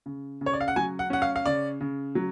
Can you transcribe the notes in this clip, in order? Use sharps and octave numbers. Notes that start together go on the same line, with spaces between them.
C#3
C#3
C#5
D5
F5
F#5
F#3 G#5
F#5
C#4 F#5
F5
F5
C#3 D5
C#3
F#3